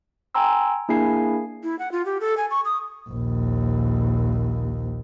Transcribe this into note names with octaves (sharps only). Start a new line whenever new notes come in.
G5 G#5 A#5 C6 E6
A#3 D4 E4 G#4 G#5 C7
E4
F#5
F4
G4
A4
G#5
C#6
D#6
A#1 D#2